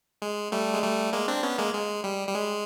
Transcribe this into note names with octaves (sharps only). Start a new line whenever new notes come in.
G#3
G3 A3
G#3
G3 A3
G#3 A#3
C4 D4
B3 C#4
G#3 A#3
G#3
G3
G3
G#3